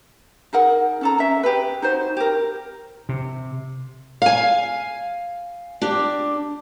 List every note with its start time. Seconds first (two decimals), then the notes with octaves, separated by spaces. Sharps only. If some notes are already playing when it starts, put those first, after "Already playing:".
0.53 D#4 G#4 A#4 F#5
1.01 C#4 A4 A#5
1.18 C#4 E5
1.43 G4 G#4 B4
1.82 D#4 F#4 C5
2.17 G4 A#4
3.09 C3
4.22 F5 G#5
5.82 D4 G4